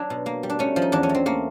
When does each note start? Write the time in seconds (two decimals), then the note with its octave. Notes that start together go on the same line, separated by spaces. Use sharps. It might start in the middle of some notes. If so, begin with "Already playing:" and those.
Already playing: F#3 D4
0.10 B2
0.26 A#3
0.43 G3
0.50 D4
0.59 A3 C#4
0.76 F3
0.82 D#4
0.92 E2 D4
1.03 C#4
1.09 E2
1.15 C4
1.26 A3 A#3